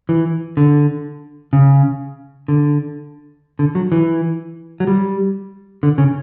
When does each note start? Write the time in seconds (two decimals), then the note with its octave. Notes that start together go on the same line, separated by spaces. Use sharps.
0.09 E3
0.57 D3
1.53 C#3
2.48 D3
3.59 D3
3.75 F#3
3.92 E3
4.80 F#3
4.87 G3
5.83 D3
5.98 C#3